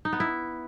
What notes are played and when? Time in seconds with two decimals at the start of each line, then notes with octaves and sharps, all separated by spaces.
0.05 D#4
0.12 B3
0.20 E4